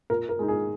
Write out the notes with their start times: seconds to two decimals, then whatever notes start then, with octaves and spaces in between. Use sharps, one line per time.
0.10 A#2 A#4
0.29 A#4
0.39 G#3 D#4
0.48 G#4